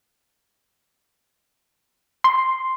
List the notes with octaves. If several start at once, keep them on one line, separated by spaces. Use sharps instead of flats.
C6